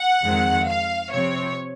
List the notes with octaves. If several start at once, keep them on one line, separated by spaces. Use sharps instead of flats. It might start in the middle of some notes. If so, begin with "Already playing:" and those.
Already playing: F#5
F2 D#3 G#3 C4
F5
C3 F3 C4 C#5